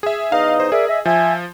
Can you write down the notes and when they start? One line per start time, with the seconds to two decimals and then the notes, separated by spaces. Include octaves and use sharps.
0.03 G#4 E5
0.32 E2 D#4 D#5 F5
0.60 C5
0.72 G#4 A#4 D5 E5
0.88 D#5 E5
1.05 F3 E5 G#5